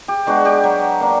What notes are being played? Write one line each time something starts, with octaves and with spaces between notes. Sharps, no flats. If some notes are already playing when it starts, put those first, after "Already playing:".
G4
G#3 B3 D4 F#4
G4
F#3
A#3 D4